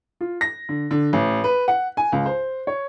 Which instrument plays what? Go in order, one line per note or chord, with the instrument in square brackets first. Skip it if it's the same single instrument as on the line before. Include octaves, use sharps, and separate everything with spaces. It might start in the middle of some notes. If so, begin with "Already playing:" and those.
[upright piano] F4
A#6
D3
D3
A1
B4
F#5
G#5
C#2
C5
C#5